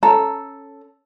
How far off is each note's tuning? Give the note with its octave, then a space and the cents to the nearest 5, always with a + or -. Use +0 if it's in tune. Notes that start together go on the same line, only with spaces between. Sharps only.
C#4 +0 A4 +0 A#5 +0